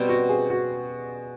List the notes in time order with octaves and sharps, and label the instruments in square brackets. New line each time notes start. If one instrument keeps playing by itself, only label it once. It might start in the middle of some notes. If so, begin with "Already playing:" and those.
Already playing: [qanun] B2 G3 C4
[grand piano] F#4
G#4
F#4